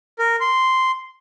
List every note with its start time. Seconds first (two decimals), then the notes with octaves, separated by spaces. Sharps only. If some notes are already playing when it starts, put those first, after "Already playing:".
0.19 A#4
0.40 C6